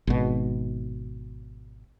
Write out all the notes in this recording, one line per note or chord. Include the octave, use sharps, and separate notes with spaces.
G#1 B2